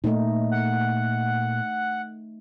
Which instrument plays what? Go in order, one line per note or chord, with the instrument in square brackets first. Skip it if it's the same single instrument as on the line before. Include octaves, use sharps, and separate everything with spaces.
[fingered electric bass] A#2 A#3 [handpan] A3 D#4
[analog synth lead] F#5